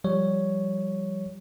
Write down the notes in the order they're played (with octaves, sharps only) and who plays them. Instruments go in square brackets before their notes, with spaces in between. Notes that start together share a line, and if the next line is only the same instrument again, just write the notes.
[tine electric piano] F3 G3 C#5